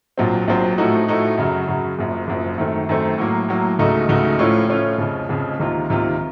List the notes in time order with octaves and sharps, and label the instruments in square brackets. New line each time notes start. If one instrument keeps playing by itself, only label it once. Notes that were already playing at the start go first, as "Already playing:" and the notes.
[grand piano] A#1 A#2 F#3 C4
A#1 A#2 F#3 C4
A2 F3 A3 D#4 F#4
A2 F3 A3 D#4 F#4
F#2 C#3 F#3
F#2 C#3 F#3
F#1 F#2 F3
F#1 F#2 F3
F#2 D#3 A3 C4
F#2 D#3 A3 C4
A2 F#3 A#3
A2 F#3 A#3
C#2 C#3 A3 D#4 F#4
C#2 C#3 A3 D#4 F#4
A2 F3 A3 C#4 F4
A2 F3 A3 C#4 F4
F1 F2 C#3
F1 F2 C#3
C#2 C3 D#3 A#3 F4
C#2 C3 D#3 A#3 F4